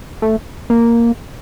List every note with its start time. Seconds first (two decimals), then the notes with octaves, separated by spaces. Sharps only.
0.22 A3
0.70 A#3